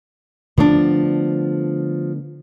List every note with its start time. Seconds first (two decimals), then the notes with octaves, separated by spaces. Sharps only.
0.58 D3 F3 A3 B3 D4